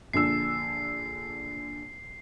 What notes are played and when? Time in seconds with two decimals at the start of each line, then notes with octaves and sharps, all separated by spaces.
0.13 A#1 D3 E6 C7